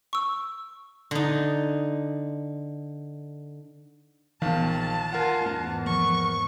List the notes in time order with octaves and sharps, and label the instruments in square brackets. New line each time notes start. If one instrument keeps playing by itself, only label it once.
[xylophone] C#6 E6
[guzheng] D3 D#4
[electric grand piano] A#1 D#3 F5 [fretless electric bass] E3 B3 [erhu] A5
[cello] F4 [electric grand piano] A#4 F#5
[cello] E2 G#2
[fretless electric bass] F3 A#3 [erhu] C#6